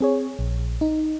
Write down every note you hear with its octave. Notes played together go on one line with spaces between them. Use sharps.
C4 G#4 C#5
A#1
D#4